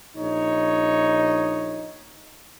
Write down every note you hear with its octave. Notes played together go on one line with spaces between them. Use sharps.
A#1 D#4 C#5